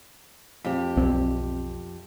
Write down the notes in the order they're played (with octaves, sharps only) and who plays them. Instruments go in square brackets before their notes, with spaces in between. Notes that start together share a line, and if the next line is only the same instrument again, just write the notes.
[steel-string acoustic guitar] F2 G4
[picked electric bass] B1 C4